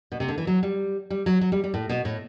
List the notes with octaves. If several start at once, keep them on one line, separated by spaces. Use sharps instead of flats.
B2
C3
D3
E3
F#3
G3
G3
F#3
F#3
G3
G3
A2
B2
A2